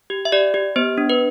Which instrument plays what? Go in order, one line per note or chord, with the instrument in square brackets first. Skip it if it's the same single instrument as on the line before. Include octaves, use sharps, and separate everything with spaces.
[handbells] G4
E5
G4 D5
G4
B3 C5
D4
B4